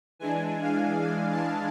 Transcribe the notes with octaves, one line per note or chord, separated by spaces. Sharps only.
E3 G#3 D4 G#5
F5
G#5
A5